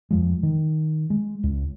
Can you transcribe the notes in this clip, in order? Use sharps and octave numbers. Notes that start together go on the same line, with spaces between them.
F2 F3 G#3
D#3
G#3
C#2